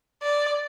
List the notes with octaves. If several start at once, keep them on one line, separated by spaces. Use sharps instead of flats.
D5